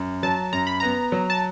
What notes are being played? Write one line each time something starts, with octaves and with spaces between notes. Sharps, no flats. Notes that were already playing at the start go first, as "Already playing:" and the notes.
Already playing: F#2
F#3 A5
F#2 A#5
B5
B3 A#5
F#3
A5